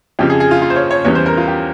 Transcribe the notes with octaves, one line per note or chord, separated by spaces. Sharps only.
F2 C#3 F3 G4
G#4
G#4
F4
F4
C5
C#5
C#5
E2 E3 G3 C#4 C#5
C5
A#4
F4
G4